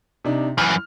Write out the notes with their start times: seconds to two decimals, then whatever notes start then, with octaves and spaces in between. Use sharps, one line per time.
0.25 C3 D4 D#4
0.58 F#2 E3 F6